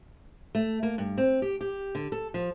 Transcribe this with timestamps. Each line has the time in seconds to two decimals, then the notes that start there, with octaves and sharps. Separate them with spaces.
0.55 A3
0.83 A#3
0.98 G2
1.18 C4
1.42 G4
1.61 G4
1.95 D3
2.12 A4
2.34 F3